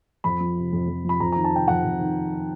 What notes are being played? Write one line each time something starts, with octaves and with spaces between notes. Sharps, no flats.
F2 B5
F3
C3
F2
F2
F3
B5
F2 A#5
D#3 A#5
A5
C3 G5
F2 F#5
F2
D#3